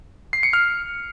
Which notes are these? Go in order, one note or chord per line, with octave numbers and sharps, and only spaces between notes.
C7
C#7
F6